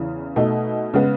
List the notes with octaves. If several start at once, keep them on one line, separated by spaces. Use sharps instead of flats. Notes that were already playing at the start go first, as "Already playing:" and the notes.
Already playing: E2 C#3 E3
B2 A3 D#4
C#3 G#3 B3